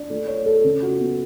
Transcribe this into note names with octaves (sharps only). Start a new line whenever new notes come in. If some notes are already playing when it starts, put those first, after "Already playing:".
Already playing: D4
A3
C#5
A4
C#3
F#4
B3